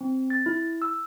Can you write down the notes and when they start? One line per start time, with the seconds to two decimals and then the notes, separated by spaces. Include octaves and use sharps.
0.01 C4
0.30 A6
0.46 E4
0.82 E6